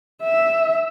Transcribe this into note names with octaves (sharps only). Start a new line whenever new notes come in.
E5